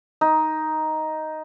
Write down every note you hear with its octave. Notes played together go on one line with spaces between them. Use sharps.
D#4